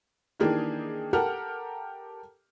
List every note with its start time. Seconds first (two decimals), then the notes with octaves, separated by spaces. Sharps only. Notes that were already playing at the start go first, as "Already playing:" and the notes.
0.40 D#3 E3 A#3 D4 G4 G#4
1.13 G4 A4 A#4 F#5 F6